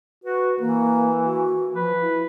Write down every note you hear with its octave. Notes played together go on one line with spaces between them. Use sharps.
F#4 B4
E3 A#3
F#4
F3 B4
E4